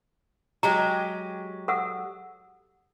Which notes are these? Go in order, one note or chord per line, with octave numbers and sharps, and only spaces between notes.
F#3 G#3 G4 A#5
A4 F#5 E6